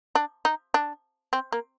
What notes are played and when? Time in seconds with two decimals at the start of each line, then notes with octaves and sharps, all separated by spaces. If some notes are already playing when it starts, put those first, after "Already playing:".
0.15 D4
0.45 D#4
0.74 D4
1.33 C4
1.52 A#3